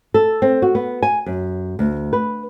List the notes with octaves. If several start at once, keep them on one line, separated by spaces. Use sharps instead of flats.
A4
C4
F#4
B3
G#5
F#2
D2
B4